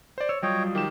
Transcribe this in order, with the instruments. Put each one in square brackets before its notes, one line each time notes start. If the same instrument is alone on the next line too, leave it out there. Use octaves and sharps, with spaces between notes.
[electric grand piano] C5 D5
[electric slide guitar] C#5 [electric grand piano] E6
[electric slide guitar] F#3 G3 F4 [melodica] C#5 D#5 G5
[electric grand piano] D#3 E7 [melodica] G4